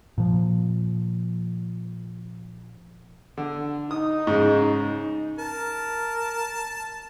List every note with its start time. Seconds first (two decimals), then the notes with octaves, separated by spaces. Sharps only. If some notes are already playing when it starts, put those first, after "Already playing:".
0.18 A#2 F3
3.37 D3
3.91 D#4 D#6
4.27 G#2 C#3
5.39 A#4 A5